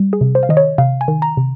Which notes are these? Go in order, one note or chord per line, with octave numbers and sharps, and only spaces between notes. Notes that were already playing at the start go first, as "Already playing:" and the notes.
Already playing: G3
G#4
C3
C5
F5
D#3 D#5
C#5
C3 F5
G#5
D#3
A#5
C3